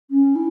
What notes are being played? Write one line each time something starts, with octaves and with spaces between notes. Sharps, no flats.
C#4
E4